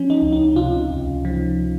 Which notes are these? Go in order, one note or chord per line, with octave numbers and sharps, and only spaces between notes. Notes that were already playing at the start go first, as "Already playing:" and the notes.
Already playing: F3 C#4
D#4
C#2
D#4
C3 F4
C#2
F3